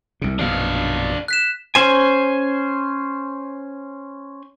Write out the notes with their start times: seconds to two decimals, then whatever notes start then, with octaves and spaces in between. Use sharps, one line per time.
0.22 C2 C3
0.39 A#1 F#2 B2 D4 F5
1.28 F#6 B6 E7
1.75 C#4 C5 G#5